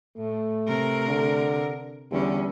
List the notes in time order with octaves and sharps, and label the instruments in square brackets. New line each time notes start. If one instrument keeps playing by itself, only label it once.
[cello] A2 [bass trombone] A3
[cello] C3 A#4
[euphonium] D3
[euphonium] E2 [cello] D3 C#4 [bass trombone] G3